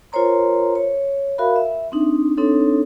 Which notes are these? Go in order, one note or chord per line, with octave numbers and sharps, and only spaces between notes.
F4 A#4 C5 C#5 A#5 C6
C#5
F#4 A#4 E5 F5 B5
E5
C4 D4 D#4
C4 D4 D#4 A4 C#5